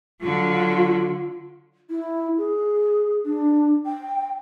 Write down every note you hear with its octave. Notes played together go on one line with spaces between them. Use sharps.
D3 F#3 F4
E4
G#4
D4
G5